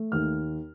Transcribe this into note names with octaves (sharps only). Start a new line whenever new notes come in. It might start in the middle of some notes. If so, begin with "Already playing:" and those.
Already playing: A3
D#2 F6